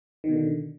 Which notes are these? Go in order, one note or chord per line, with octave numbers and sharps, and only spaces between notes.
B2 D3 D#3